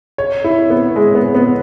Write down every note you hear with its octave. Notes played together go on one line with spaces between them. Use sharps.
C#5
E4
B3
G#3
B3
B3